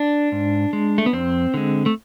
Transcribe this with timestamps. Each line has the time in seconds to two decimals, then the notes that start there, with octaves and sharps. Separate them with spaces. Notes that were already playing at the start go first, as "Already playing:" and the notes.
Already playing: D4
0.32 G#2
0.73 G#3
0.98 A3
1.06 B3
1.13 F2 C4
1.54 D3 G#3
1.86 A3